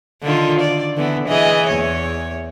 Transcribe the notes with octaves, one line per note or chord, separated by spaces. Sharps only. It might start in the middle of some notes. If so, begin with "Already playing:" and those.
D3 D#3 F4
D5
D3 E3 B3
E3 G#4 D#5
E2 C#5